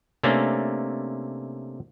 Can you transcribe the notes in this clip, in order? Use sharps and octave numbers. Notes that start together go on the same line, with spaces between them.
C3 A3 A#3 C#4 D4